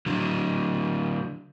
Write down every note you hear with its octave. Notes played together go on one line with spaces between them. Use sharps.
D3 F#3